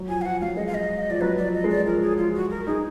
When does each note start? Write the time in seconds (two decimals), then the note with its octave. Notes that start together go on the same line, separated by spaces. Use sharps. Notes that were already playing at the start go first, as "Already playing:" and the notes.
Already playing: F#3
0.09 F3 G#5
0.21 F5
0.25 F3 F#5
0.41 F#3 F5
0.57 G#3 D#5
0.67 F5
0.74 D#5
1.10 F3 D5
1.21 F#3 B4
1.38 D5
1.43 F3
1.54 D#5
1.64 G#3
1.70 D5
1.86 F3 A#4
2.02 G#4
2.18 F4
2.35 F#4
2.50 A#4
2.67 D#4 G#4